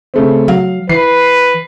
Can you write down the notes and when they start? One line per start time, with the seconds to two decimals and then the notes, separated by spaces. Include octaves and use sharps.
0.14 C#3 A3 C4
0.48 F#3 F5
0.89 E3 B4 C7